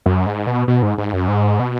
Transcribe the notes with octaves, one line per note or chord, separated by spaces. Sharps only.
F#2
G#2
B2
B2
G#2
G#2
F#2
G#2
B2